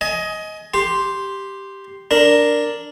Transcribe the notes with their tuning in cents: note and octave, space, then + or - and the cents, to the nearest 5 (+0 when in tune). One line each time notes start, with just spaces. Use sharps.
D#5 +15 G#5 +30
G4 +0 C6 +0
D4 +0 A#4 +0